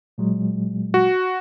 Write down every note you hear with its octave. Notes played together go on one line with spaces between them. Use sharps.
A#2 F#3 G#3
F#4